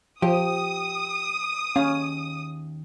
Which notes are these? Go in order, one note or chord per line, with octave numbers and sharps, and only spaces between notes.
F3 G4 D#6
D#2 C#4 F5